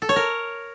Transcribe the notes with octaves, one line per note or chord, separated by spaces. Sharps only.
A4
C#5
A#4